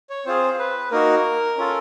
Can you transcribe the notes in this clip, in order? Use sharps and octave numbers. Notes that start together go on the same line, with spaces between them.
C#5
C4 F4 G#4 C5
B4
A#3 D#4 F#4 A#4
C#4 F4 A4